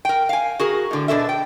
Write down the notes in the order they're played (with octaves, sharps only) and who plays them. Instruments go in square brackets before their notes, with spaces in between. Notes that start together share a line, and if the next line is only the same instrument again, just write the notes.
[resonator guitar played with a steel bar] A#4 G5
F5 G#5
F#4 G#4 A#4
A2 D3
B2 D4 A4 E5
G5